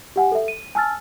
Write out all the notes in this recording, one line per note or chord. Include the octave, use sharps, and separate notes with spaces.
G4 F#5 G#5
A4 E5
D#7
G#5 A5 E6 F6 A6